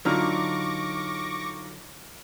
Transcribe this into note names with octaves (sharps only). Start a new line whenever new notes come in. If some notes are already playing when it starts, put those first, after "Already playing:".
D3 F#3 D#4 F4 C#6 D6 F6 A#6